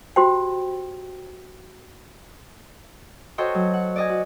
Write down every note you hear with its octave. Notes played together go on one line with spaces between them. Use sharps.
F#4 G4 C5 G5
F#4 A4 C5 C#5 D#5 G5
F#3
F#5
D5 D#5 G#5
F#4